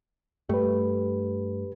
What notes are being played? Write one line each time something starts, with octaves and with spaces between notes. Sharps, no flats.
G2 A3 G4 B4